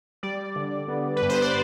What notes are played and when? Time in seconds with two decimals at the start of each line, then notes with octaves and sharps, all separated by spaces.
0.23 G3 D5
0.56 D3
0.88 B3
1.16 B4
1.22 G2
1.29 C5
1.42 D5